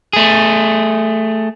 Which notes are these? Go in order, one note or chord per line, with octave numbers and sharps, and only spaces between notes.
A3 G#4